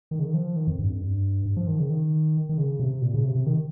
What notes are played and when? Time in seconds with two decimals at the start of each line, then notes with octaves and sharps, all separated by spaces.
0.11 D#3
0.19 C#3
0.26 D#3
0.34 F3
0.56 D#3
0.67 F2
0.79 G2
0.90 F2
1.00 G2
1.45 G2
1.57 F3
1.67 D#3
1.79 C#3
1.90 D#3
2.49 D#3
2.58 C#3
2.80 C3
3.02 A#2
3.14 C#3
3.24 C3
3.35 C3
3.46 D#3